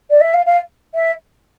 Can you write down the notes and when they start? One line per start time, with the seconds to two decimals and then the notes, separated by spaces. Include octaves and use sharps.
0.10 D5
0.21 E5
0.34 F5
0.46 F5
0.95 E5